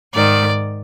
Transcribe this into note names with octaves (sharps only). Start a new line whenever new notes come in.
G#2 D#3 D5